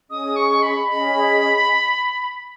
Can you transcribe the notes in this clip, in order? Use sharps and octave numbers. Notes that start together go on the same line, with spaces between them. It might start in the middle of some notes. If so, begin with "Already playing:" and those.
C#4 G#4 D#5 D#6
C#6
B5
C#4 G#4 D#5 B5